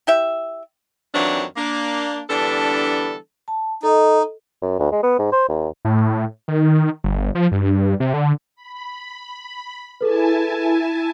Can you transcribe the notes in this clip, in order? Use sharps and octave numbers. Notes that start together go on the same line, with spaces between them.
E4 G4 E5
F2 D#3 E3 F#3 C4 D4
A#3 D4
D3 E3 G3 B3 D4 A4
A5
D#4 A4 D#5
F#2
D2
G#3
B3
G#2
C5
D#2
A2
D#3
G1
F3
G2
C3
D3
B5
E4 G#4 A4 B4 G#5 A5